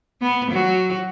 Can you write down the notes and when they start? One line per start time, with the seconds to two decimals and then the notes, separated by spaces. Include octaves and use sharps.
0.22 B3
0.51 F#3 F#4